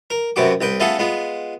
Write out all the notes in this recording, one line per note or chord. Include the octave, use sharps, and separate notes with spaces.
A#4
F#2 C3 B3 F#4 D6
C2 B4 G5
A3 B3 C#4 F4 G#4 A4
G#3 B3 F4